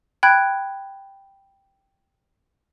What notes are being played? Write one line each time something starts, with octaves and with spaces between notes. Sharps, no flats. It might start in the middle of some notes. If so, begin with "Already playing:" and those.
G5 B5 F#6 G#6